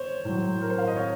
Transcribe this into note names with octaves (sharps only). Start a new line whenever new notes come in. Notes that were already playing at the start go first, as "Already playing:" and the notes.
Already playing: C5 C#5
A2 F#3
A#4
C5
F5
D#5
C#5